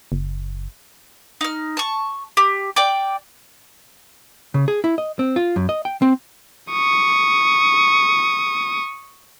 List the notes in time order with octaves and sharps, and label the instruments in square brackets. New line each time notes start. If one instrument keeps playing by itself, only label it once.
[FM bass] F#1
[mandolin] D#4 F6
A5 C#6
G4
D5 G5 D6
[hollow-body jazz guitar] C#3
G#4
E4
D#5
C4
F4
F#2
D#5
G5
C4
[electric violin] C#6 D#6